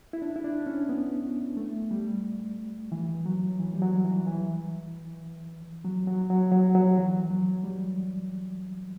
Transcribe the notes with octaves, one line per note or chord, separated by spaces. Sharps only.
E4
D4
E4
D4
C#4
B3
A3
G3
E3
F#3
E3
G3
F#3
E3
E3
F#3
F#3
F#3
F#3
F#3
E3
F#3
G3